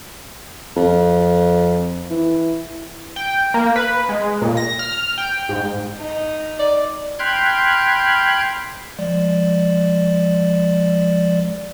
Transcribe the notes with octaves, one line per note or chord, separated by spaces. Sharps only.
F2
E3
G5
A#3
B4
G#3
A#2
A#6
F6
G5
G#2
D#4
D5
G5 B5 C6 F6 F#6 G#6
F3 G#3 D5